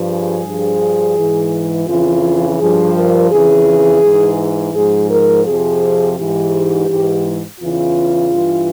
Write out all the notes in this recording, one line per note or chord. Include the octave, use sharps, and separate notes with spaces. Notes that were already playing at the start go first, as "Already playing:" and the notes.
Already playing: G2 F3
G#4
G2 F3
G#2 E3
F2 C#3 E3 F4
G2 F3 G#4
A#4
F2 C#3 E3 G#4
G#2 E3
G#2 F3 G#4
A#4
F2 C3 F3 G#4
G#2 E3 G4
G#2 E3
E2 C#3 E3 F4
G2 E3